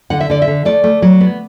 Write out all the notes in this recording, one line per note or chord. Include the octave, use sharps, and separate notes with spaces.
D3 F#5
E5
D3 D5
E5
D3
A3 D5
A3
F#3
B3